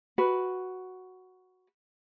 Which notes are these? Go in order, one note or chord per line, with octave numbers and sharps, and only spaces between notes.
F#4 B4